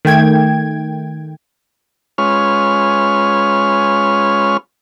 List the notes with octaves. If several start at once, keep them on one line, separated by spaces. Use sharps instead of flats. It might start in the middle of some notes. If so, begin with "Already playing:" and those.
D#3 A3 G5 G#6
G#3 C#4 F4 B4 C#5 F6